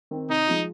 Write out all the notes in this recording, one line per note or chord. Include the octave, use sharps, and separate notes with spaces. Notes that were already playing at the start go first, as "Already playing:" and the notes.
D#3 C4
C3 D#4
F3 G#3 F4